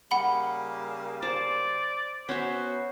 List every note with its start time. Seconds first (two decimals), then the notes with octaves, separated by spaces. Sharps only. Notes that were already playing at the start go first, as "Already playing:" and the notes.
0.11 C#3 G3 A#3 F#5 B5 G7
1.22 C5 D5 A5
2.29 B3 C#4 F#4 C5 E5